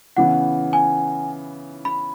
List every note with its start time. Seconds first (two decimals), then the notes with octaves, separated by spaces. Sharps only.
0.17 C#3 E3 B3 F#5
0.73 G#5
1.85 B5